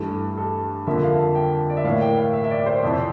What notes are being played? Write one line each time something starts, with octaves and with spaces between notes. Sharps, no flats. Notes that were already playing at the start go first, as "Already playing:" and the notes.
Already playing: G2 E3 A3 A4
A4
F2 D3 F3 A#3 E5
F5
A5
G5
D5
E5
A2 E3 A#3 F5
G5
F5
E5
E5
D5
C5
F2 C3 E3